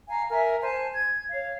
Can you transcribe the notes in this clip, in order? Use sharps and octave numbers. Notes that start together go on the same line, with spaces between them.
F5 G#5 A#5
A#4 E5 G#5
C5 G#5 A5
G#6
C#5 F5